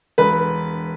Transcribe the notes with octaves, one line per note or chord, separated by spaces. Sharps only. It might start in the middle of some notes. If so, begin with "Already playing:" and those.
E1 B4